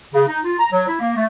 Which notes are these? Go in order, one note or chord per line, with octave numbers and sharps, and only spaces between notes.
C#3
D#4
F4
A#5
F#3
E4
A#3
A3